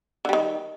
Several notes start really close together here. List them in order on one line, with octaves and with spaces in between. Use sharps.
D3 G3 D#3